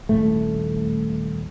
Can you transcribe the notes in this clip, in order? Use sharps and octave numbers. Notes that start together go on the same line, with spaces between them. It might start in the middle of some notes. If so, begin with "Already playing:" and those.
D#1 A2 A3